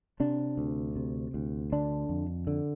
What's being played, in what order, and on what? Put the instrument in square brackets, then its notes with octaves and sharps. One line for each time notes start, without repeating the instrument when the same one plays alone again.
[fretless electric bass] C3 D4
D2
C3
D2
D3 D4
F2
D3